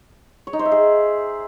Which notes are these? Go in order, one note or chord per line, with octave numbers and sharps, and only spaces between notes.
C#5
D#4
C5
E5
G#4